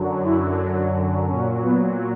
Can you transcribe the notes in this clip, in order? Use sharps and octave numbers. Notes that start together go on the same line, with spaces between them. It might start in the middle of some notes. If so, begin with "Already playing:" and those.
Already playing: F#2 D3 F#3
E4
A#2 F#3 C#4
B3